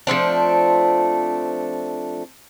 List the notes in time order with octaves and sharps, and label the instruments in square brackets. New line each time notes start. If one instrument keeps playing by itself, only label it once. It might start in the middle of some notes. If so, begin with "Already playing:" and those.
[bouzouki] F3 A3 C4 D4